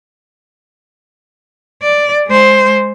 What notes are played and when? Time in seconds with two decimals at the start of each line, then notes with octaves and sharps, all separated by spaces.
1.83 D5
2.27 G#3 C5